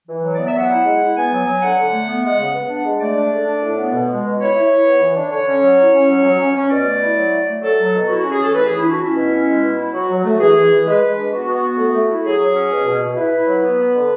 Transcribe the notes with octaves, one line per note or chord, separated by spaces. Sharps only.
E3
F#3
B3 D5
E5
F#3 F#5
E4
G#3
E4
B3 G#5
F#3
F#3
D3 F#5
D3
A3
B3
G#3
C#3
B3
D4
G#3
A3 D5
D4
A3
D4
A2
B3
B2
G#3
B2
E4 C#5
E4
E4
B3
E3
D4
D3 C#5
C#4
F#3
E4
C#4
F#3
F#3
C#4
C#4
B2 D5
A3
E4
F#3
A3
A3
F#3 A4
F#3
B2
E4 F#4
C#4 F#4
G#4
E3 A4
A2 B4
E3 G#4
E4
D4 F#4
C#4 E4
B2
C#4
G#3
B2
E4
F#3 F#4
F#3
A3
E3 G#4
E3
E3
G#3 B4
G#3
D4
B3 F#4
B3
B3
A3
A3
E4
F#3 G#4
F#3
C#4
B2
B2
B2
E4 B4
E4
F#3
B3
B3
D3